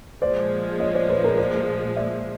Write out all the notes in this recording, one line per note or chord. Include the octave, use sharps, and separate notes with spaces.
A#2 F3 G#3 C5 D5
C#5 D#5
C5 D5
B4 C#5
A#4 C5
C5 D5
D5 E5